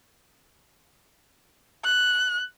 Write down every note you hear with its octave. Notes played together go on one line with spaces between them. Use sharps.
F#6